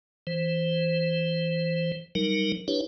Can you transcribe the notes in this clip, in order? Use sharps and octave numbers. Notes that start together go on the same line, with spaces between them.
E3 C5
F#3 G3 D#4 A#4
D4 E4 G4 B4 C#5